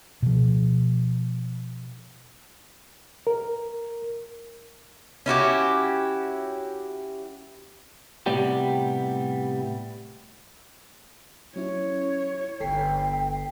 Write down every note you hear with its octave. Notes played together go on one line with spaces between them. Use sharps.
B2 F3
A#4
C#4 E4 F#4 G4
A2 C3 G3 B3 G4
F#3 C#4 E4 C#5
G1 A4 G5 B6 C7